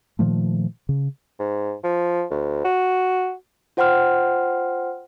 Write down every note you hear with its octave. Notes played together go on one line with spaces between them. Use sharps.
A#2 D#3 F3 A3
C#3
G#2
F3
D2
F#4
F4 C5 F#5 G5 C6 F6